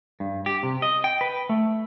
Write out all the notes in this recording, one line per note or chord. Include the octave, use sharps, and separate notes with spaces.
G2
G4
C3
D#5
G5
B4
A3